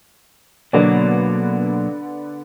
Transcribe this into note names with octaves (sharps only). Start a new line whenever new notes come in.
B2 D3 F#3 A#3 B3 D5